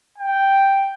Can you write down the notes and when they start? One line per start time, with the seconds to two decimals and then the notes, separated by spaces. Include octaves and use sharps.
0.18 G5